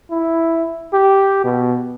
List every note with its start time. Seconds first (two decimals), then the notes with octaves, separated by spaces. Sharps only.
0.11 E4
0.93 G4
1.44 B2